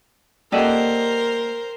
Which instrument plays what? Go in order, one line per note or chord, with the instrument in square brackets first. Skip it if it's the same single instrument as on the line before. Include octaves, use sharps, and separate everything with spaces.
[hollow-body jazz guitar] A#3 D#5 F#5 [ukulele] G4 A4 D5 [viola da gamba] A#4 C5